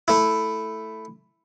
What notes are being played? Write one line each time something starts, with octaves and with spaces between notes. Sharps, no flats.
A3 E4